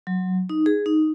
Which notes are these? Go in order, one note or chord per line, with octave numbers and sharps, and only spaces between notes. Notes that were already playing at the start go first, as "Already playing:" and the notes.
F#3
D#4
G#4
D#4